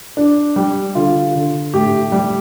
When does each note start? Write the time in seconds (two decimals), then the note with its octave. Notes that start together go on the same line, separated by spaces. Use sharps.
0.17 D4
0.56 G3
0.95 D3 F4
1.35 D3
1.74 A2 G4
2.12 G3